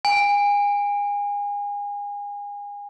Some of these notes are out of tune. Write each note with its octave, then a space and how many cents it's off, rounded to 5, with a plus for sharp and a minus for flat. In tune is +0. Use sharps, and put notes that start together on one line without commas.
G#5 -30